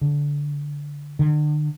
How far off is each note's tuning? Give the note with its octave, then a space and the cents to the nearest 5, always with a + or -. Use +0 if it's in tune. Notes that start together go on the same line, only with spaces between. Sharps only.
D3 -15
D3 +45